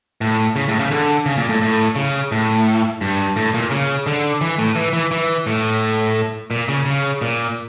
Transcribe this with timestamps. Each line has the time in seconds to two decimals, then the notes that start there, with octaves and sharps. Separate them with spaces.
0.21 A2
0.56 C#3
0.68 A2
0.79 C#3
0.91 D3
1.26 C#3
1.37 A#2
1.49 A2
1.62 A2
1.96 C#3
2.32 A2
3.01 G2
3.36 A2
3.54 A#2
3.71 C#3
4.07 D3
4.41 E3
4.58 A2
4.76 E3
4.93 E3
5.11 E3
5.47 A2
6.51 A#2
6.68 C#3
6.86 C#3
7.22 A#2